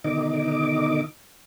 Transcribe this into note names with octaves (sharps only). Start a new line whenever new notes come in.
B2 D3 D#3 D#4 D#5 D6